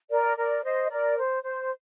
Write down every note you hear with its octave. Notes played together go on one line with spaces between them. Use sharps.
A#4 D5
A#4 D5
C5 D#5
A#4 D5
C5
C5